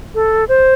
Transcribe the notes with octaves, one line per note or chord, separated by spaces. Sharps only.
A4
C5